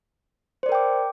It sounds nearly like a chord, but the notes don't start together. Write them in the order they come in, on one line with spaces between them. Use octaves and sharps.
C5 D5 A#4 G5 D6